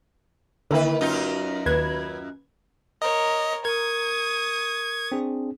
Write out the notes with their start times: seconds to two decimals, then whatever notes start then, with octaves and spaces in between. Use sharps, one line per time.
0.71 D3 D#3 A#3 E4 B4
1.01 F#2 D#4 F4
1.66 D#2 B4 G#6
3.02 A#4 C#5 D#5
3.65 A#4 C#6 D#6 G#6
5.12 C4 D4 G#4